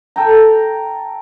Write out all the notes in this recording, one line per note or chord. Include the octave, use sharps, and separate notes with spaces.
A4 G5 A#5